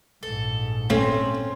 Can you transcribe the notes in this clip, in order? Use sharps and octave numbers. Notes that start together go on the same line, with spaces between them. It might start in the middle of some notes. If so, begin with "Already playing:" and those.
A#1 G#2 A4
A3 C4 C#4